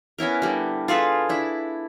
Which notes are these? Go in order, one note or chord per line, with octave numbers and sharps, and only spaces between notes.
B3 C#4 E4 A#4
D3 G3
F4 G#4 A4 B4
D4 E4